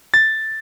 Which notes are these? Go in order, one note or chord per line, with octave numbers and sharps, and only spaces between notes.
A6